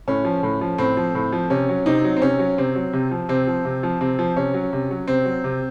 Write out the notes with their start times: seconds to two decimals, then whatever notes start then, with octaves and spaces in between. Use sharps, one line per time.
0.08 A2 C#4
0.25 F3
0.43 A2
0.61 F3
0.78 A2 C4
0.97 F3
1.15 A2
1.32 F3
1.50 C3 C#4
1.69 F#3
1.86 C3 C4 D#4
2.04 F#3
2.17 C4
2.22 C3 C#4
2.39 F#3
2.58 C3 C4
2.75 F#3
2.93 C3
3.11 F3
3.29 C3 C4
3.47 F3
3.65 C3
3.83 F3
4.01 C3 C4
4.19 F3
4.37 C3 C#4
4.54 F#3
4.73 C3
4.91 F#3
5.08 C3 C4
5.25 F#3
5.44 C3